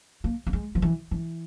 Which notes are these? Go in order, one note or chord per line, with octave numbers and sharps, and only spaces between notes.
A#3
A#3
G#3
F3
E3
E3